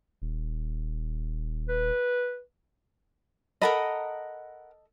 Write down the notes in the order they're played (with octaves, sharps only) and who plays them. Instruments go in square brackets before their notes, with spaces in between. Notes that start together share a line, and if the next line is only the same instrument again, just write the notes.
[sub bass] D#1
[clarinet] B4
[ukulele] A4 D#5 [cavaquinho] A#4 F#5 B5